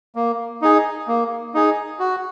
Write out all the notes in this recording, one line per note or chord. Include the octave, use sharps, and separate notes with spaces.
A#3
D#4 G#4
A#3
D#4 G#4
F#4